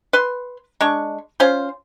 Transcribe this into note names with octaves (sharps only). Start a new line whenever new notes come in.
B4 C6
G#3 D4 C#6
C#4 F4 C5